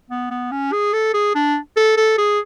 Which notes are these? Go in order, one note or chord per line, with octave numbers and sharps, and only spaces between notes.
B3
B3
C#4
G#4
A4
G#4
D4
A4
A4
G#4